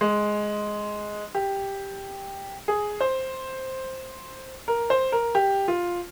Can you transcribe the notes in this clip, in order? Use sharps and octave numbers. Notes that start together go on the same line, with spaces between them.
G#3
G4
G#4
C5
A#4
C5
A#4
G4
F4